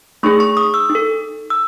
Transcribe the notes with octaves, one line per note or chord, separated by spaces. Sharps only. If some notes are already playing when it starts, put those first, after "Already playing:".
A3 D#4 G#4 C#6
C#6
D#6
E6
D#4
A4
E6